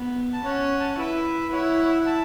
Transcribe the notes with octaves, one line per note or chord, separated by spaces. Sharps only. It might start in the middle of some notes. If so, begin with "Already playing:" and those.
Already playing: B3
A5
C#4 C#5 F#5
A5
F#5
E4 B4 E5
E4 C#5 F#5
C#5
E5
F#5
E5 A5